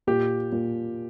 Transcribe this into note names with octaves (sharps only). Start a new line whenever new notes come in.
A#2 G4
A#2